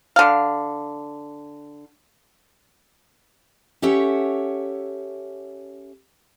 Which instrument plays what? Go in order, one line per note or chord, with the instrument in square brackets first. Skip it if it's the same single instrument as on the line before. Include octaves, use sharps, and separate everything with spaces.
[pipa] D3 F5
[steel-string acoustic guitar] C#4 G4 A4 C#5 E5 F#5